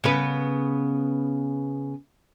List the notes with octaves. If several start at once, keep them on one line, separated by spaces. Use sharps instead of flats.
C#3 B3 B4